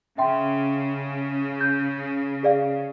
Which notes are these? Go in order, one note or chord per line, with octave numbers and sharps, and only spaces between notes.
C#3 E5 G5 C6
G6
G#4 D5 F5